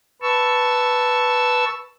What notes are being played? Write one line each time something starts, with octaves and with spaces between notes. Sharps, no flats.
B4 A5 C#6 E6